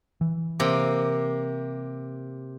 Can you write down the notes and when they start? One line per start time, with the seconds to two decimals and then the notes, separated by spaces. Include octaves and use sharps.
0.21 E3
0.60 C3 A#3